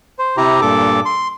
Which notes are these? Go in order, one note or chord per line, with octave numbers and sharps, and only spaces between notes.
C5
C3 E4 G4 A#5
G2 A#2 A4 D6
C6